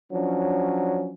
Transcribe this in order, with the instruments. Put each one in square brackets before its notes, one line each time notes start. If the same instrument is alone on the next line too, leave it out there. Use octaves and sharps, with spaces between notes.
[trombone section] F3 F#3 C#4 D4